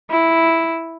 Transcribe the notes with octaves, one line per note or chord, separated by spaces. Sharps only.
E4